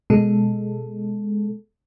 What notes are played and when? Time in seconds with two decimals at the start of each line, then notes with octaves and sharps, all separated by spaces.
0.10 B2 G#3 A4